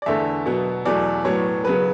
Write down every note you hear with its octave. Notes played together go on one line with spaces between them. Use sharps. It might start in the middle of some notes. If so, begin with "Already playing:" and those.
D5
E2 D3 A3 E5
B2 F#3 B3
E2 B2 F#3 A3 D5
A2 F#3 B3 C#5
C#3 F#3 B3 B4